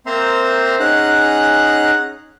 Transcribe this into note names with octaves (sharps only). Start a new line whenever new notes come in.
A#3 C4 C5 E5 A#5 C6
C#4 D#4 G#4 F#5 A#5 F#6